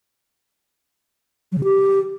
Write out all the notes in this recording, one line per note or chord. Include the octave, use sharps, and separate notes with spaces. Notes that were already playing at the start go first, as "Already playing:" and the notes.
F#3
C#3
G4